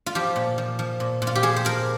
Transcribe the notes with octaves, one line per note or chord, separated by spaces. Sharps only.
F4
F3 G4
A#2
F3
F3
A#2
A#2
F4
G4
F3 G#4
C5
F3 A#4